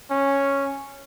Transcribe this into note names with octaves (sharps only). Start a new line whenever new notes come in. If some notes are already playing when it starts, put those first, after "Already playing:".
C#4